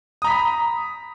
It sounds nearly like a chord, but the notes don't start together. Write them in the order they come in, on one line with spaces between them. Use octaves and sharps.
D#6 A#5 B6 B5